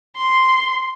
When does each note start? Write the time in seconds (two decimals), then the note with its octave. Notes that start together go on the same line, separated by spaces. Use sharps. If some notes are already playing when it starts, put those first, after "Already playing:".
0.16 C6